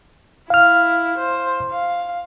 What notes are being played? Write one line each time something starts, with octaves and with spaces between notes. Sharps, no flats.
E4 F5 F6
C5
F5